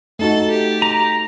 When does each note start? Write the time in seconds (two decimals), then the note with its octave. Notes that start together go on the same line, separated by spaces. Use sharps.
0.19 A3 D#4 F#4 A4
0.51 G4
0.82 A#5